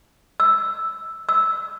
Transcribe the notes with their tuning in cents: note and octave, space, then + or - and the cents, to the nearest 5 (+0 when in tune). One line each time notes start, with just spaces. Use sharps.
E6 +0
E6 -10